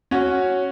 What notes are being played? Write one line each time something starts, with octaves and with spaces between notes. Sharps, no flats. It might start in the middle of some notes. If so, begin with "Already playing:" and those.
C#4 F#4 C#5